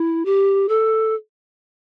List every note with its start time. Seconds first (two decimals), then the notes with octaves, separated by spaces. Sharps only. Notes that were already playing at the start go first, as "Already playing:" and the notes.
Already playing: E4
0.25 G4
0.69 A4